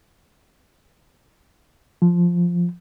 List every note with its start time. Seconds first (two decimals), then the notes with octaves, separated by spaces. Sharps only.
2.02 F3